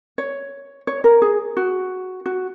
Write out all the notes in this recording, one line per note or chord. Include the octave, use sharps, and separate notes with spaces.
C#5
C#5
A#4
G#4
F#4
F#4